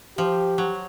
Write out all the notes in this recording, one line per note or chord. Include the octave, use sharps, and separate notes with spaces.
F3 G4
F#3